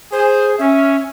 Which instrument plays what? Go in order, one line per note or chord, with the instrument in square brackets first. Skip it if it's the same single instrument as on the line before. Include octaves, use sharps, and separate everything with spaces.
[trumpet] G#4 [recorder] C5
[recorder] C#4 [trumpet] E5